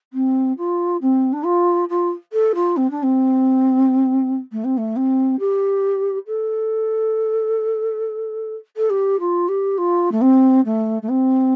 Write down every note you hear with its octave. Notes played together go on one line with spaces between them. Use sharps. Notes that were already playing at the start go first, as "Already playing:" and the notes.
C4
F4
C4
D4
F4
F4
A4
F4
C4
D4
C4
A3
C4
A3
C4
G4
A4
A4
G4
F4
G4
F4
A3
C4
A3
A3
C4